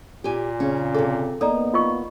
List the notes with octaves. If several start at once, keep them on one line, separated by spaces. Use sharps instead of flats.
A#2 G4 G#5
C#3 C#4
C3 G#4 A4
A#3 B3 D#4 A4 D5 A#5
F4 D#5 C#6